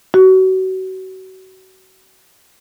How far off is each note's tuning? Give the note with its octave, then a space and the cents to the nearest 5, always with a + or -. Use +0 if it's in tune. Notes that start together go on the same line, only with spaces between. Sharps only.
F#4 +30